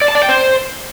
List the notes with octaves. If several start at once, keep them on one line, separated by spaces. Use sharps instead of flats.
D5
A5
D5
G5
C5